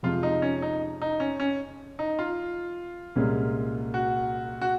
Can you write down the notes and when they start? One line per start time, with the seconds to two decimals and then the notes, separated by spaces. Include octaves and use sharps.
0.03 F2 C3 F3 G#3 F4
0.23 D#4
0.42 C#4
0.62 D#4
1.02 D#4
1.20 C#4
1.40 C#4
1.99 D#4
2.19 F4
3.16 C2 A#2 G#3 C#4
3.94 F#4
4.62 F#4